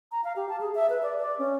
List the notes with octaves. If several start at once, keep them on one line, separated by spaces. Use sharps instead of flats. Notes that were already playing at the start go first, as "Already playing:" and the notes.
A#5
F5
G4
A5
G#4
E5
B4
D5
D5
C#4